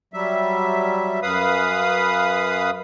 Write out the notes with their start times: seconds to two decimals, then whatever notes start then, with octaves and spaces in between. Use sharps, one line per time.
0.14 F#3 G3 E5
1.22 F#2 B4 F5 B5 D#6